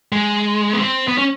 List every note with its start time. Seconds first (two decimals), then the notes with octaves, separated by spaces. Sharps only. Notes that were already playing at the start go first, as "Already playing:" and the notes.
0.12 G#3
0.73 B3
0.79 C4
1.08 B3
1.18 C#4